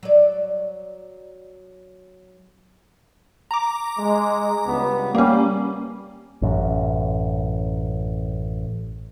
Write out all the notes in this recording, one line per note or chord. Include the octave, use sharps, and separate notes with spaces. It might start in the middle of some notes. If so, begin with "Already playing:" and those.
F#3 D5
A#5 D6
G#3
C#2 G2 B3
G3 A#3 C#4
A1 F#2